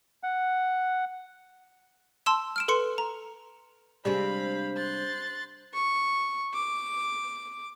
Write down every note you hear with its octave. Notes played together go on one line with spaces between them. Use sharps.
F#5
A5 C6 E6 E7
F6 D7 E7
A4 B4 C6 C#7
A#5
C3 G3 G#3 D4 C5 F5 B5
C6 F#6 A6
C#6
D6